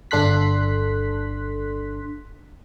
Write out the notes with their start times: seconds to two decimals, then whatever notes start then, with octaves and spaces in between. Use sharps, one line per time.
0.11 G1 D4 A4 C6 F#6 B6